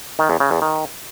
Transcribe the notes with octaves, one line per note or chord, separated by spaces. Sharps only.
D#3
E2
C#3
E2
D#3